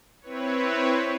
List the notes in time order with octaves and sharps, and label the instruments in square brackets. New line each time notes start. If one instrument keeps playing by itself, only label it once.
[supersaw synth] C4 E4 B4 C#5